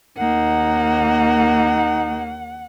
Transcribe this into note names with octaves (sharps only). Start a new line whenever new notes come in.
D#2 A#3 D#4 F#5